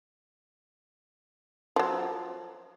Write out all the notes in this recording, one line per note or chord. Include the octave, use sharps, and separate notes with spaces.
F3 F#3